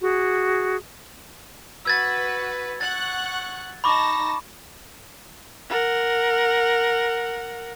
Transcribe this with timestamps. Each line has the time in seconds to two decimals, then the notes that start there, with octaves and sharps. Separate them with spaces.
0.01 F#4 G#4
1.85 F#4 B4 E6 G#6 A6
2.81 F#5 C#6 F#6 A6
3.84 D#4 A5 B5 C#6 D6 A#6
5.69 A#4 F#5